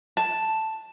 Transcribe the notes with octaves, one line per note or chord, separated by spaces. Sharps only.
A5